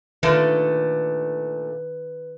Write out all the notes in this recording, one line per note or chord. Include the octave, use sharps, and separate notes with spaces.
A#2 D3 D#3 A3 B4